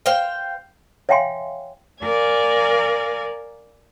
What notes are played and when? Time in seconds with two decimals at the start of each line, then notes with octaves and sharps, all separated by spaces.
0.06 C5 F5 G5
1.09 C#5 E5 F5 G5 G#5 C6
2.02 A#4 D5 F5 G#5